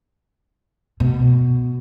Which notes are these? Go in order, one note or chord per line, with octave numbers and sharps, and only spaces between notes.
B2